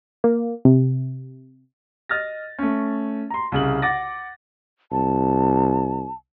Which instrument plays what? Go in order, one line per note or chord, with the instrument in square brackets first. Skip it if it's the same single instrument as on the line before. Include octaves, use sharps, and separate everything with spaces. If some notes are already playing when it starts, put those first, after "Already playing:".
[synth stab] A#3
C3
[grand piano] D#5 F6 A6 A#6
A3 C#4
A#5 C6
C2 C#3 F#7
F#5 D6 A6 A#6
[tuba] C2 [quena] A5